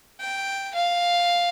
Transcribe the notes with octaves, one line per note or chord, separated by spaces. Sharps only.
G5
F5